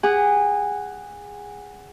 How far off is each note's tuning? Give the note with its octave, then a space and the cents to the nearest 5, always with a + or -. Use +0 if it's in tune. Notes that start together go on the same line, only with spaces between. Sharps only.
G#4 -20 F#5 +10